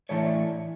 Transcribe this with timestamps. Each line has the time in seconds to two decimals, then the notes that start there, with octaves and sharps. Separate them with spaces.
0.09 A2 E3 A3 D4 C#5